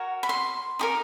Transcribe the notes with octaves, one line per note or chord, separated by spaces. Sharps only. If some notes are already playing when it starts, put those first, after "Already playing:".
Already playing: F#4 A#4 C#5
B5
C6
D#4 G4 A#4